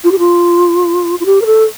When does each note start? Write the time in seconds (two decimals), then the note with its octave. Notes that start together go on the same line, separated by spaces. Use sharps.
0.04 F4
0.12 G4
0.19 F4
1.20 F4
1.26 G4
1.42 A#4
1.46 A4